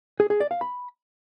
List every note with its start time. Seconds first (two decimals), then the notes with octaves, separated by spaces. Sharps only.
0.20 G#4
0.30 G#4
0.40 D5
0.51 F5
0.61 B5